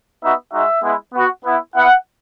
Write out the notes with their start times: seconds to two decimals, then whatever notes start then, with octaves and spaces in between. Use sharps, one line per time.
0.21 B3 D#4 F#4 E5
0.52 G#3 D#4 F#4 E5
0.82 G#3 B3 E4
1.13 B3 F#4
1.45 B3 E4
1.75 B3 E4 F#5